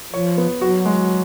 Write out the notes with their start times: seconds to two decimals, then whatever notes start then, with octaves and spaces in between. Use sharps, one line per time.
0.13 F3 C#5
0.38 B3
0.61 F#3 F#4
0.85 G#3